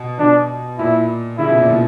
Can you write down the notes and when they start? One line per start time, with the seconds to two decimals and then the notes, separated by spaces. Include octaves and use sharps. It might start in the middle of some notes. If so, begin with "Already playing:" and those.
Already playing: B2
0.19 B2 D4
0.79 A#2 E4
1.38 C#3 E4
1.49 B2
1.58 A#2
1.69 B2